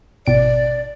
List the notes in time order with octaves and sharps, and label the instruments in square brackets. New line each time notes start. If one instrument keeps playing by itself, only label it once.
[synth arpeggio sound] G#1 B2 D7 [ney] D5